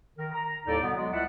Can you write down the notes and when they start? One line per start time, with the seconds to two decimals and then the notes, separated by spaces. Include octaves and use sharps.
0.18 D#3 A#4
0.33 A#5
0.66 D#2 A2 G3 D#4 A4 D5
0.82 B2 D3 B3
0.96 F#3 G#3 B3
1.13 C#2 G3 E4 D5 E5 F#5